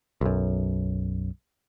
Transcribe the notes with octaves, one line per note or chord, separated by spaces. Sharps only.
B1 F#2